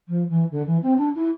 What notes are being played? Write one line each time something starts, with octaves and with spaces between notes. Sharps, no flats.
F3
E3
D3
E3
C4
D4
E4